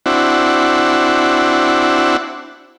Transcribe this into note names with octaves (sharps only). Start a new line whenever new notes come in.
C4 D4 E4 F#4